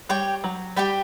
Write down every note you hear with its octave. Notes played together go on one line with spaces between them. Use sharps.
G3 G4 C#5 G5
F#3
G3 G4 D5 G5 B5